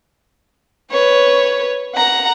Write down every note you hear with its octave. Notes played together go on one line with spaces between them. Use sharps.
B4 C#5
F#5 A#5